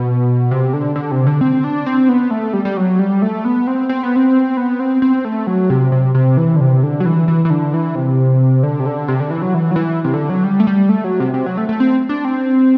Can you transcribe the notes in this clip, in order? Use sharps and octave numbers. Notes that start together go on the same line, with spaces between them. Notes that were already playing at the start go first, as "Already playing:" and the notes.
Already playing: B2
C3
D3
D3
C3
D3
C4
D4
C4
B3
A3
G3
G3
F#3
G3
A3
B3
C4
C4
B3
C4
B3
C4
C4
A3
F#3
C3
C3
C3
E3
D3
C3
D3
F#3
E3
E3
E3
D3
E3
C3
D3
C3
D3
C3
D3
E3
F#3
E3
F#3
E3
C3
D3
F#3
G3
A3
G3
A3
F#3
C3
C3
F#3
A3
A3
C4
D4
C4